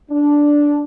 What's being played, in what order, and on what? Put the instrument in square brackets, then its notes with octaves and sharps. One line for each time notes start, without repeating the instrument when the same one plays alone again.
[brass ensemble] D4